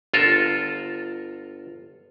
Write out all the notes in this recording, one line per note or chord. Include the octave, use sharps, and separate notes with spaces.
G1 F4 A4 A#4